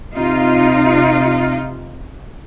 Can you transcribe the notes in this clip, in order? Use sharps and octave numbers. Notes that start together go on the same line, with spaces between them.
C3 D#4 F4